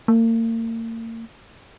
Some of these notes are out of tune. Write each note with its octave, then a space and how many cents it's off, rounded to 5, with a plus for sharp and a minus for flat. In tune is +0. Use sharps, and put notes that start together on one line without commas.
A#3 -40